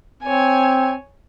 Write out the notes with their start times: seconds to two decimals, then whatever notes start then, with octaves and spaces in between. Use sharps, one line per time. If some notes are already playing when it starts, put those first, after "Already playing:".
0.23 C4 C#5 G#5